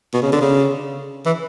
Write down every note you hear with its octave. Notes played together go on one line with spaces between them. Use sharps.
B2
C#3
D3
C#3
E3